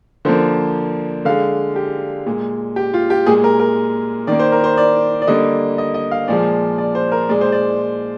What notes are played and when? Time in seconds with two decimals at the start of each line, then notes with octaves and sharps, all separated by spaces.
0.25 D3 F3 A#3 C5
1.25 D3 G#3 F5
1.76 G4
2.26 A#2 G#3
2.76 G4
2.94 F4
3.10 G4
3.26 A#2 G#3 G#4
3.44 A#4
3.60 A#4
4.27 D#3 A#3 D5
4.39 C5
4.52 A#4
4.64 C5
4.77 D5
5.22 D5
5.27 D3 G3 A#3 D#5
5.78 D#5
5.94 D#5
6.11 F5
6.28 A#2 F3 G#3 D5
6.78 D5
6.95 C5
7.12 A#4
7.29 A#2 G#3 D5
7.41 C5
7.52 D5